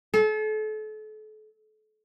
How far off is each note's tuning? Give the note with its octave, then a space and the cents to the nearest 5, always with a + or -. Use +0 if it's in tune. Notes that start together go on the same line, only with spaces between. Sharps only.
A4 -35